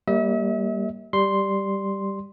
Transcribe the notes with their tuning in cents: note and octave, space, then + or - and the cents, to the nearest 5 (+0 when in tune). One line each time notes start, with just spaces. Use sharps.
G3 +0 A#3 +0 E5 -40
G3 +0 C6 +0